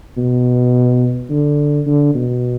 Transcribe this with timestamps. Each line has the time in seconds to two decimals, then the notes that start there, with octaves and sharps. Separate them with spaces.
0.18 B2
1.30 D3
1.86 D3
2.14 B2